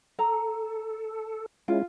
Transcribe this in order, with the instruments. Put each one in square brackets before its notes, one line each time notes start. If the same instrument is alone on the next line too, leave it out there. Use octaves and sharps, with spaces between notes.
[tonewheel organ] A4 [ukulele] A#5
[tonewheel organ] G#3 C#4 E4 [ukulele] F4